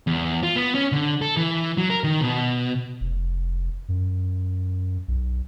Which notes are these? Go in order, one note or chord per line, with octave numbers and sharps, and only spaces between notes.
E2
F4
B3
C#4
D3
A4
E3
F#3
A#4
D#3
B2
F1
F#2
B1